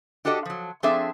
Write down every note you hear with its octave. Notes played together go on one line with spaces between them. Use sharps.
D4 F#4 G4 A4 D#5
F3 F#3
F3 C4 D4 G#4 A4 E5